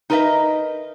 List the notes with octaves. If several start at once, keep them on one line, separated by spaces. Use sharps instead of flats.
D#4 A#4 B4 C#5 D#5 E5